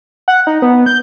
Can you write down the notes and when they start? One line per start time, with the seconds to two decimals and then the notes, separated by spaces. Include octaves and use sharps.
0.28 F#5
0.47 D#4
0.62 B3
0.86 G6